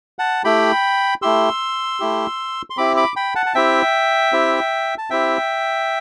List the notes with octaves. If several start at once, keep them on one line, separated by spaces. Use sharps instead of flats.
F#5 A5
A3 E4 G4 G5 B5
A3 E4 G4 C6 E6
A3 E4 G4
C6
C4 E4 G4 B5 D6
B5 D6
G5 B5
F#5 A5
A5
C4 E4 G4 E5 G5
C4 E4 G4
A5
C4 E4 G4 E5 G5